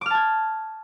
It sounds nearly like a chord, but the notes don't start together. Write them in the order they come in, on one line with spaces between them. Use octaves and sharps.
D6 F6 A5 G#6